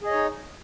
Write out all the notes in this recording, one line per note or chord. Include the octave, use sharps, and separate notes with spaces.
D#4 G#4 C#5 D#5